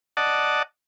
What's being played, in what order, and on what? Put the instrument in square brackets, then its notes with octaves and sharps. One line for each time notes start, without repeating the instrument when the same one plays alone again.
[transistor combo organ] D5 D#5 F#5 A5